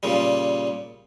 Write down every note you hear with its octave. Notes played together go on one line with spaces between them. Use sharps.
A#2 C#3 G3